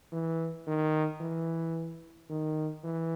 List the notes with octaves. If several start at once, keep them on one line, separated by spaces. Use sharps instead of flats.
E3
D#3
E3
D#3
E3